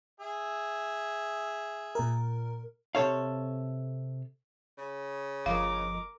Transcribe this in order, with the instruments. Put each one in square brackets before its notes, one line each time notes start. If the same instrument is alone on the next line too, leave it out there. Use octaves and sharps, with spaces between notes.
[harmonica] G#4 E5
[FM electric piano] A#2 A#4
[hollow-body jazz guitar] C3 A4 C#5 F5
[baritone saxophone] C#3
[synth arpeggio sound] G1 F3 D#5 [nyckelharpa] A#4 D6 [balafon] F5